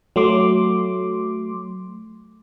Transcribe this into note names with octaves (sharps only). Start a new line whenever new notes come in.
F#3 A3 C6 D6